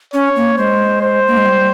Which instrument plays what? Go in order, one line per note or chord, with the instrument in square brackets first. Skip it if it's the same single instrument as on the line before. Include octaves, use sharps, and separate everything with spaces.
[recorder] C#4 [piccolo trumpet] C#5
[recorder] A#3
[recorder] G#3 [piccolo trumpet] C5
[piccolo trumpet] C5
[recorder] A#3
G#3
G3